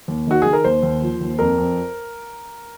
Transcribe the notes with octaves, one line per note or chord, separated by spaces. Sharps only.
D#2
D#3 F#4
D#3 G#4
A#4
D#2 C5
D#2
F3
D#2
F2 A#4
F2